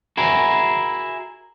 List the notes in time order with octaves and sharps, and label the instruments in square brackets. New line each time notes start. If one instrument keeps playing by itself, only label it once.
[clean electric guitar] E4 F#4 G#4 A#4